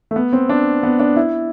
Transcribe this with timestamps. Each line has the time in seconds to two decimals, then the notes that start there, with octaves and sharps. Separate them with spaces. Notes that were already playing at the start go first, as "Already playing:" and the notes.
0.11 A3
0.16 B3
0.33 C4
0.49 D4
0.83 B3
1.00 D4
1.16 E4